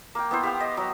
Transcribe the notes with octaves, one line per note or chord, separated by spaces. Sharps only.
A#3 G5
B3 E4 C5
G4 F5 G5
D#5
F#3